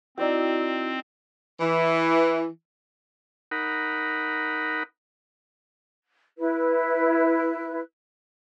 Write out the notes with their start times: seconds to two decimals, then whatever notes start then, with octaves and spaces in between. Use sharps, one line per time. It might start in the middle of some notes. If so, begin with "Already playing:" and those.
0.18 C4 D#4 E4 F#4 D5 G5
1.60 E3
3.51 D#4 A#4 F#5 B5
6.38 E4 B4